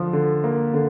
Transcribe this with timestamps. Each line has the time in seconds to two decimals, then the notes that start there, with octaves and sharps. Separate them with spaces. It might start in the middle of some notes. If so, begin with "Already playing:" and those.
Already playing: D3 F3
0.13 D3
0.44 A#3
0.74 D3